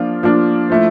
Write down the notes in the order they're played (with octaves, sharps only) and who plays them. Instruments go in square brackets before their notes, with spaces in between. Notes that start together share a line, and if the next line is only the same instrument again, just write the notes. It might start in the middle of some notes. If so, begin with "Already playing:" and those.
Already playing: [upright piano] F3 A#3 D4 F4
F3 A#3 D4 F4
F3 A3 E4